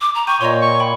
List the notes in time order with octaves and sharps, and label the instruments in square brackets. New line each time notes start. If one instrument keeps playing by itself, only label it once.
[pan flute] D6
A#5
[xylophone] G5 G6 D#7 [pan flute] C#6
[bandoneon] A#2 [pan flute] C#5 [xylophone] D#5 C6
[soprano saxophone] C#6
[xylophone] G5 B5